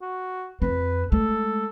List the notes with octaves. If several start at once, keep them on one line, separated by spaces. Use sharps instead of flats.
F#4
F2 C4 B4
G#3 A3 A4